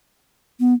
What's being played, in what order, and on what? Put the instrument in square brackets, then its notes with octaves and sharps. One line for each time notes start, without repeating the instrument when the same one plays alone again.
[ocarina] B3